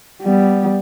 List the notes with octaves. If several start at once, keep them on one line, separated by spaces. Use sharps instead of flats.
G3 B3